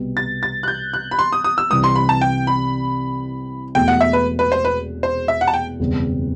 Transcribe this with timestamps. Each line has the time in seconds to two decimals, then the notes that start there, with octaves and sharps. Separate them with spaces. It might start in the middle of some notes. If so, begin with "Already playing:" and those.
Already playing: C2 B2 G3 B3
0.17 A6
0.43 A6
0.63 F#6
0.68 G6
0.94 F#6
1.11 B5
1.19 C6
1.33 D#6
1.44 D#6
1.58 E6
1.70 C2 C3 E3 G3 C4 D#6
1.84 C6
1.96 B5
2.09 A5
2.21 G5
2.47 B5
3.75 E1 E2 B2 A3 G5
3.88 F#5
4.01 E5
4.13 B4
4.39 B4
4.52 C5
4.65 B4
5.03 C5
5.28 E5
5.41 F#5
5.48 A5
5.54 G5
5.79 F#1 E2 B2 G3 C4